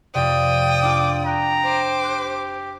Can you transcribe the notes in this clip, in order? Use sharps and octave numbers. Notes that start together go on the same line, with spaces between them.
F2 C3 D5 G5 D#6
D4 F4 A4 D6
G5 A#5 F#6
C5 D6
G4 F#6